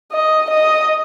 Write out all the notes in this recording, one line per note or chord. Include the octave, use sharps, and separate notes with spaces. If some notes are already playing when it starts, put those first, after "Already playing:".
D#5
D#5